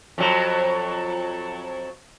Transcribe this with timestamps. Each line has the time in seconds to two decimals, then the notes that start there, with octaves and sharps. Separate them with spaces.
0.18 F2 F#3